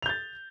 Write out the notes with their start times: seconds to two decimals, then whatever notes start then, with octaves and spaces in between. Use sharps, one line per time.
0.02 F7
0.06 G6
0.09 A6